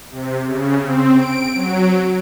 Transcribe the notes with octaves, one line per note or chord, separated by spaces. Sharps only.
C3
C#3
C4
D7
F#3